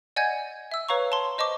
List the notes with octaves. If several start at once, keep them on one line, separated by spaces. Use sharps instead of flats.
D5 D#5 F#5 G#5 G6 G#6
E5 E6
B4 C#5 F5 A#5 C#6
A5 C6
C5 D#5 A5 C#6 D6